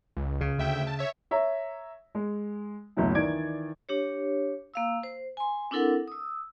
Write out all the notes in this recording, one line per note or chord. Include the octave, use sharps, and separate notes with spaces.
C#2
C#3
D2 E5 G5
A5
C#5 E5
C#5 E5 A#5
G#3
F#1 D2 B2 F#3 E4
D#3 E3 D5 G#6 D7
D4 G4 C#5
A#3 F5 E6
C5
G#5 C6
C4 D4 E4 A4 A#4 F#5
D#6 E6